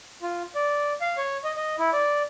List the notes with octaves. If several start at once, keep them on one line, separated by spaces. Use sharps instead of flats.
F4
D5
F5
C#5
D#5
D#5
E4
D5